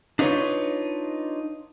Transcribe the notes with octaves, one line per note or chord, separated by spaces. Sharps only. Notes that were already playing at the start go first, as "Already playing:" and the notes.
D4 D#4 F4 B4 C#5